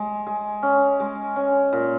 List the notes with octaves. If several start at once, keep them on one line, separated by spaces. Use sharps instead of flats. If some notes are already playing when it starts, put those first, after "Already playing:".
Already playing: G#3
G#3
C#4
G#3
C#4
A#2